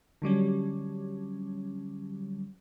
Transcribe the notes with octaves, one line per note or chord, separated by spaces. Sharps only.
D3 F#3 G3 C#4